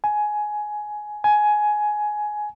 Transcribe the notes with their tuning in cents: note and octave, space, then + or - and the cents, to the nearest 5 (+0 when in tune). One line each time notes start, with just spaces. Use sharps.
G#5 +15
G#5 +15